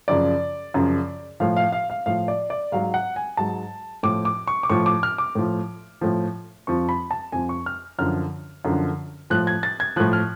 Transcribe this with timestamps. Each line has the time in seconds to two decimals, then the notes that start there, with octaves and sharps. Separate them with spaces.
0.08 F#2 C#3 F3 D5
0.74 F#2 C#3 F3
1.40 A2 F3 F5
1.57 F5
1.72 F5
1.90 F5
2.06 A2 F3 F5
2.28 D5
2.50 D5
2.72 G#2 F#3 F5
2.94 F#5
3.16 G#5
3.37 G#2 F#3 A5
4.03 A2 F3 D6
4.25 D6
4.48 C#6
4.63 D6
4.70 A2 F3 C#6
4.86 D6
5.03 F6
5.18 D6
5.35 A2 F3
6.01 A2 F3
6.67 F2 F3 C#6
6.89 B5
7.11 A5
7.32 F2 F3 G#5
7.49 C#6
7.66 F6
7.99 F#2 D3 F3 F6
8.65 F#2 D3 F3
9.30 A2 F3 F#6
9.47 G#6
9.63 A6
9.80 G#6
9.96 A2 F3 F#6
10.13 F6